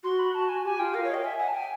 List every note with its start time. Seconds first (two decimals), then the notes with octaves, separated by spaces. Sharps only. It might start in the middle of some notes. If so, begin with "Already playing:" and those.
0.04 F#4 C6
0.19 B5
0.34 A5
0.49 G#5
0.64 G4 G#5
0.79 F4 G5
0.94 A#4 F5
1.04 C#5
1.10 D#5 G5
1.24 E5 G#5
1.39 F#5 G#5
1.47 A5
1.54 G5 G#5